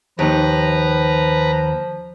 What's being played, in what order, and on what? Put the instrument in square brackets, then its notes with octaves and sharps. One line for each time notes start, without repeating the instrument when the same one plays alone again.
[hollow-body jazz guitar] D#2 D#4 [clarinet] F3 [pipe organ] B4 A#5